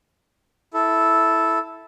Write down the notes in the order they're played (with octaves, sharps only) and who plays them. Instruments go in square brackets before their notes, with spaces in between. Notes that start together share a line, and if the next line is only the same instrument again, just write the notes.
[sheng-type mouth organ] E4 A4